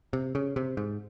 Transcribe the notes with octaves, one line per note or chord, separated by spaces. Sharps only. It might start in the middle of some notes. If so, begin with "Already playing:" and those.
C3
C#3
C3
G#2